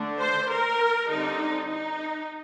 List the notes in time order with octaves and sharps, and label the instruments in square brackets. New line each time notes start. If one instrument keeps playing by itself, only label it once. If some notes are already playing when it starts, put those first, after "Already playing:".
Already playing: [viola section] D3 A3 D4
C5
A#4
D3 G3 C4 D#4
D#4